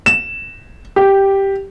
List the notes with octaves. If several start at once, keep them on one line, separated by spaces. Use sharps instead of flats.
E7
G4